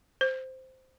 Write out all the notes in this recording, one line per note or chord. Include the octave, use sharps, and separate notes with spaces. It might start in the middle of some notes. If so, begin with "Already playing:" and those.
C5